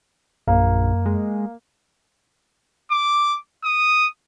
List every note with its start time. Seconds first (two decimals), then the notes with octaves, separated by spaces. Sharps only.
0.48 A#1 F#2 A#3
1.06 G#3
2.91 D6
3.64 D#6